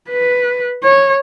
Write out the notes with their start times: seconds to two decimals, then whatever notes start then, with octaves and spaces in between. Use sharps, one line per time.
0.10 B4
0.84 C#5